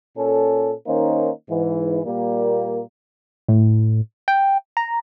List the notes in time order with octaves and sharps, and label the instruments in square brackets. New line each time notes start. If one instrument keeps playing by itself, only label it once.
[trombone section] A#2 C#4 A4
D#3 A#3 C#4 D#4 C5
G#2 E3
A#2 G3 A#3
[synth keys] A2
G5
A#5